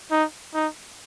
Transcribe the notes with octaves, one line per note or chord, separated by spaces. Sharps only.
D#4
D#4